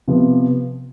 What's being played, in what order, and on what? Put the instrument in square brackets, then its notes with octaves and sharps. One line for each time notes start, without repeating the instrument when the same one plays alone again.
[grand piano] C3 F3 B3 F4